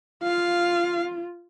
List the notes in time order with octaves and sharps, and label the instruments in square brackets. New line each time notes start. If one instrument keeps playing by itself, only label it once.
[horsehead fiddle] F4 [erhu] F5